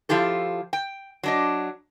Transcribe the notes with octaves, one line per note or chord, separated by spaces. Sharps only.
F3 E4 F4 G4 A4
G5
F#3 D4 D#5